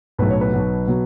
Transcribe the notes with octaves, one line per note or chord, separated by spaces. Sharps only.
B1 A2 F#3 B4
C#5
B4
B1 B2 F#3
B2 F#3